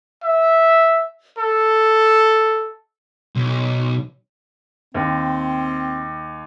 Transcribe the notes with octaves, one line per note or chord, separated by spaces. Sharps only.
E5
A4
B1
D#2 C4